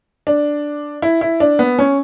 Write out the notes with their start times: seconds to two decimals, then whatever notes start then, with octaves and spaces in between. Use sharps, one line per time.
0.27 D4
1.02 E4
1.21 E4
1.40 D4
1.59 B3
1.79 C#4